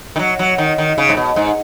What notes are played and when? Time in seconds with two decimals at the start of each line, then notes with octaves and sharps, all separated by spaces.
0.16 D#3
0.19 F#3
0.39 F#3
0.58 D#3
0.78 D#3
0.98 C#3
1.09 G#2
1.17 B2
1.36 G#2